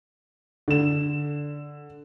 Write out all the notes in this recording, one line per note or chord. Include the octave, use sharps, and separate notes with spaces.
D3 E7